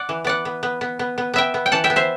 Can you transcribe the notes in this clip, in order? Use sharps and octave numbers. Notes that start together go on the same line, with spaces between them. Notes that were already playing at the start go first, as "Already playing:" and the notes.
Already playing: D5 F#5
E3
B3 D5 F#5
B3
B3
B3
B3
B3
B3 E5 G5
B3
G5
E3 F#5 A5
E5 G5
B3
C5 E5